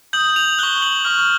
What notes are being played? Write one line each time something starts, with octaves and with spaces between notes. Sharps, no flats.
D#6 G6 F#7
F7
C#6 F#6 G7
F#7
C#6 F6